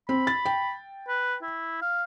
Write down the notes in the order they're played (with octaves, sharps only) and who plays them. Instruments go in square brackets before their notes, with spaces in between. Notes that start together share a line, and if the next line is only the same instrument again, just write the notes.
[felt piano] C4 [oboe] B5
[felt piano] A6
G5
[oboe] B4
E4
F5